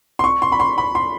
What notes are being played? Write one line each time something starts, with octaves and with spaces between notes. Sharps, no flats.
C6
C#6
C6
B5
C6
B5
C6